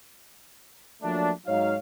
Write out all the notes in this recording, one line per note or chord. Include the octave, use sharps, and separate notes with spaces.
F3 F#3 A3 A#3 D4
G#2 F#3 D#4 C#5 F5